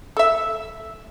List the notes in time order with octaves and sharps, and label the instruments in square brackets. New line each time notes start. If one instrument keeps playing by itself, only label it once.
[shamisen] A4 E5